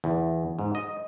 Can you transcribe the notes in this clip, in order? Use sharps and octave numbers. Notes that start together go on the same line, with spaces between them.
E2
G#2
D#5